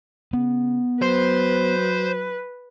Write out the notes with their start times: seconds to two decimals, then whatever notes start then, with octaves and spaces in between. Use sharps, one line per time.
0.33 C#3 B3
1.02 F#3 B4 C5